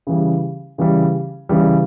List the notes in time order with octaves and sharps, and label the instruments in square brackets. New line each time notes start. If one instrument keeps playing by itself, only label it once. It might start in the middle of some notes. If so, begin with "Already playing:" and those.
[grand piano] C#3 E3 G3
C#3 E3 G3
C#3 E3 G3